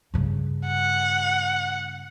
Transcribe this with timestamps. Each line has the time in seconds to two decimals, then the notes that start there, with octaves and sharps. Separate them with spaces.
0.14 G2 C#3
0.67 F#5